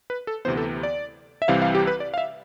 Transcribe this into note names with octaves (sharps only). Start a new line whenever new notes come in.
B4
A4
D2 C3 E3 B3 C5
A4
D5
E5
C2 C3 E3 G3 C4 F5
F5
G4
B4
D5
F5
E5